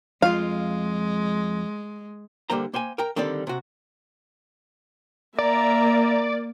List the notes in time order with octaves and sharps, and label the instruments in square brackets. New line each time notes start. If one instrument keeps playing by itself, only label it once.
[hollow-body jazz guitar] F2 F4 [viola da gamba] G#3 [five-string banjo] F5
[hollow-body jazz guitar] D3 G3 A#3 C5 A#5
A#3 C5 G5 G#5
A#4 G5 A#5
D3 D#3 G3 C4 A4 D5
C3 F#4
[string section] A#3 [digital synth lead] D5 [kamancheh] E5 A#5